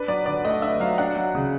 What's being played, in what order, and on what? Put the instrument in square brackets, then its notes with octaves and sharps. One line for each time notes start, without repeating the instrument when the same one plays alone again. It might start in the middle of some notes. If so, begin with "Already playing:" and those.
Already playing: [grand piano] D4 [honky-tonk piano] B4
[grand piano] F#3 [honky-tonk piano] D5
[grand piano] D3 [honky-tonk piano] D5
[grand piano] A3 [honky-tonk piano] D#5
[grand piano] D4 [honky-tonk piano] E5
[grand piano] F#3 [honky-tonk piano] F5
[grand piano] D4 [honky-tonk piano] F#5
[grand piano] F#3
C#3